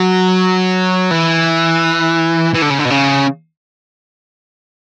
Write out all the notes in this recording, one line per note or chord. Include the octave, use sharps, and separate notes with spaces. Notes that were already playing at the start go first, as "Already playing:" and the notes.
Already playing: F#3
E3
E3
D3
C#3
D3
B2
C#3